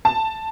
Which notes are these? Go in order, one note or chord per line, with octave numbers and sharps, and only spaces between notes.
A5